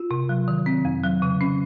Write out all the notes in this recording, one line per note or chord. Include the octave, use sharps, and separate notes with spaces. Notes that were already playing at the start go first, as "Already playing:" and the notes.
Already playing: F4
C3
F#3
D#3
C4
F2
F#3
C#3
C#4